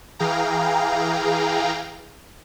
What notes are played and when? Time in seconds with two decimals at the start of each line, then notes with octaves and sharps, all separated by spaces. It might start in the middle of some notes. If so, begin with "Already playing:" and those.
0.19 E3 G#4 F5 G5 A#5